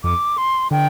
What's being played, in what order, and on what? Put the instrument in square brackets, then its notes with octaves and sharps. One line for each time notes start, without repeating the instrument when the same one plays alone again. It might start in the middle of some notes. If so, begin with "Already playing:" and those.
[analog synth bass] F2 [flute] D6
[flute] C6
[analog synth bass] D3 [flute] G5